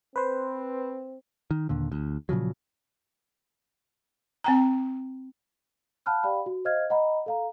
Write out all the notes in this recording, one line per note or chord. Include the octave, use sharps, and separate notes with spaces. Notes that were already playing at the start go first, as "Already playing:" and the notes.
C4 B4 C5
D#3
D#2 A#2 D3
D2
A#2 C#3 F3 F#3
C4 G5 A#5
F5 F#5 A5 B5 F6 F#6
G4 D5 F5 G5 B5
F#4
C5 D#5 F5 F6 G#6
D#5 F#5 A#5 B5
A4 F5 A#5